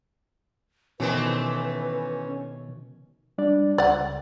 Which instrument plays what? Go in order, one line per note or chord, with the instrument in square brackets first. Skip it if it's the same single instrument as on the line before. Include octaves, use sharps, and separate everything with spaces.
[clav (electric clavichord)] B2 D#3 [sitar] E3 A3 C4 [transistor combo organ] C#4 [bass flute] B4
[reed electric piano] G3 D4 D5
[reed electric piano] C#2 [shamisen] D5 F#5